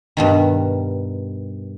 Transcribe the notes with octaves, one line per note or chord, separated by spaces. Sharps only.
G2 B2 D#3